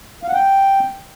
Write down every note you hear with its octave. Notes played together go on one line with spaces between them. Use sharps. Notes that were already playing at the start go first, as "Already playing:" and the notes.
F5
F#5
G5